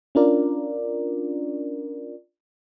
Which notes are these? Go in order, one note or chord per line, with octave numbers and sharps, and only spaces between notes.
C#4 D4 F4 A#4 D5